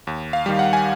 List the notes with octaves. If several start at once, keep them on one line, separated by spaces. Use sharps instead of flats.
D#2
F5
D#3 G3
F#5
G#5